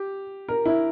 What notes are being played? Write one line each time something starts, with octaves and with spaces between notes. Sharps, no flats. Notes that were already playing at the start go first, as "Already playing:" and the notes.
Already playing: G4
A#4
E4